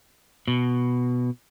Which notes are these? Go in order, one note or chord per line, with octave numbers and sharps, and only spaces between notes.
B2